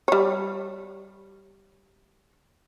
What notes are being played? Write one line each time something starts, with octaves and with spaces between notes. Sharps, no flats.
G3 C#5